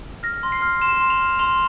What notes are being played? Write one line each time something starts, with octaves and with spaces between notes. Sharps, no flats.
F6 A#6
C6
C7
F6
C6 E7
C6
F7
F6
C6 F7